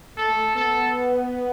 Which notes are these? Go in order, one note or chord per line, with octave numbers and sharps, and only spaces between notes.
A3 A4
B3 A4